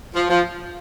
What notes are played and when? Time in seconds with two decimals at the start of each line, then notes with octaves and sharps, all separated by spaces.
0.14 F3
0.29 F3